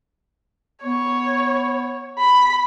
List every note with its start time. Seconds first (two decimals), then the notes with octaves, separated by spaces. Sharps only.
0.84 B3 C#5
2.19 B5